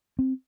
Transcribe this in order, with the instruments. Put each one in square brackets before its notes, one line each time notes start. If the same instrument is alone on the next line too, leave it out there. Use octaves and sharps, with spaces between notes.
[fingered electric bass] C4